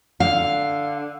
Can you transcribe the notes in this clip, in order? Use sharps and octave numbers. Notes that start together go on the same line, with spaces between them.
D3 F5